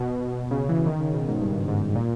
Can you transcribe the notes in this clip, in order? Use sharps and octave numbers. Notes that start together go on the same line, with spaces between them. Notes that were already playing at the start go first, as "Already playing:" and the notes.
Already playing: B2
B2
C#3
E3
D#3
C#3
B2
G#2
G2
G2
G#2
G#2
A#2